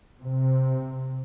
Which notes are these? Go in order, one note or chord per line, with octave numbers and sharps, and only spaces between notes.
C3